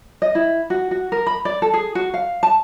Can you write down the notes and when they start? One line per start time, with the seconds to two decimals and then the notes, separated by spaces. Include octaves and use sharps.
0.22 D#5
0.35 E4
0.70 F#4
0.91 F#4
1.12 A#4
1.27 B5
1.45 D5
1.62 A4
1.73 G#4
1.95 F#4
2.14 F5
2.43 A5